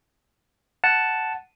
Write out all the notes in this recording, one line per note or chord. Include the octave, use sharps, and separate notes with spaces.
F#5 A5